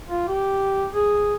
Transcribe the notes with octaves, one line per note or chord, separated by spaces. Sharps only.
F4
G4
G#4